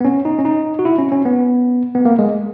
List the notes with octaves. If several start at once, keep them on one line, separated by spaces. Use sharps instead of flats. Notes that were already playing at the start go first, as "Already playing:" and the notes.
B3
C#4
D#4
C#4
D#4
F#4
E4
C#4
C#4
B3
B3
A#3
G#3